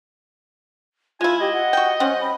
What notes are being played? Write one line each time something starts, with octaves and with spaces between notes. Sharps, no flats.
G#3 E4 F4 G#5
G4 D#5
F#5
F#4 G5
G3 C4 C#4 F#5
B5